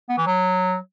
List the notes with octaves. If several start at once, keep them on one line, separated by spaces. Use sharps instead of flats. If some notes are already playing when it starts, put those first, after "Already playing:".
B3
E3
F#3